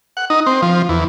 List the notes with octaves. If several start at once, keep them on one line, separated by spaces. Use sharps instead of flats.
F#5
D#4
C4
F3
E2